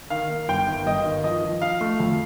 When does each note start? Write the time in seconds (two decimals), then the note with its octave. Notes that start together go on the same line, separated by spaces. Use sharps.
0.10 D#3 F5
0.30 A#3
0.49 G1 G5
0.68 D#3
0.86 G1 D#5
1.05 D#3
1.24 F3 D#5
1.44 F3
1.62 F3 F5
1.81 A3
2.00 F2